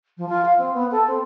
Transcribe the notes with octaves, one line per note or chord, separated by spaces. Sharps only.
F3
F4
F5
C4
B3
A4
C4